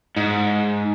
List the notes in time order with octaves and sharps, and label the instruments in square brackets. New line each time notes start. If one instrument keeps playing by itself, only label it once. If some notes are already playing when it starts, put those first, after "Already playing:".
[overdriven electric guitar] G#2